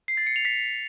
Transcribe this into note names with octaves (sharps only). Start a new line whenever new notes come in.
C7
A6
C#7
F7
B6